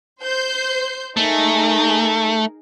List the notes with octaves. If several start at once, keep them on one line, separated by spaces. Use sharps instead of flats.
C5 G6 C7
A3 D#4 G#4 A#4